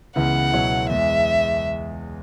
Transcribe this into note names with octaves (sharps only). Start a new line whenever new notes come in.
C#2 C#3 E3 B3 E4 F#5
C#2 B2 F#3 E4 C#5
E2 E3 G#3 E5